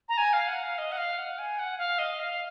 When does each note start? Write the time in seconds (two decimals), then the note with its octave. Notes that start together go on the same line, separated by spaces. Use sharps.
0.09 A#5
0.17 G#5
0.33 F5
0.48 F#5
0.63 F5
0.78 D#5
0.92 F#5
0.97 F5
1.18 F#5
1.38 G#5
1.59 F#5
1.78 F5
1.99 D#5
2.19 F5